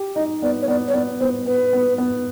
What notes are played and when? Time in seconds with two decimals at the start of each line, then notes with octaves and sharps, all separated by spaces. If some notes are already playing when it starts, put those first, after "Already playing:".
Already playing: G4
0.16 D#4 D#5
0.42 B3 D5
0.62 C#5
0.68 B3 D5
0.88 C#5
0.94 B3 D5
1.20 B3 C5
1.46 B3 B4
1.73 B3
1.98 B3